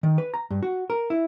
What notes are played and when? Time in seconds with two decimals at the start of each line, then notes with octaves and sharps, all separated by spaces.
0.03 D#3
0.18 B4
0.34 A#5
0.51 G2
0.63 F#4
0.90 A#4
1.10 E4